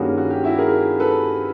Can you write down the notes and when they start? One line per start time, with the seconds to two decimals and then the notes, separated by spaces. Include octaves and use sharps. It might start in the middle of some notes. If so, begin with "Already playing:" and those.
Already playing: G2 D#3 G3 A#3 C#4 F#4 G#4
0.17 F#4
0.31 G4
0.44 E4 F#4
0.58 G#4 A#4
1.00 A4 B4